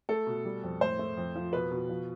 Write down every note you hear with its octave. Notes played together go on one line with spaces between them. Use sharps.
A3 A4
B2
G3
F2
A2 C5
A3
F2
F3
B2 B4
B2
F3